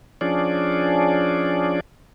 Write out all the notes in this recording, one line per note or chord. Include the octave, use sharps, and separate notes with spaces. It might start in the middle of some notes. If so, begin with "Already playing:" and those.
F3 C#4 D4 G#4 D5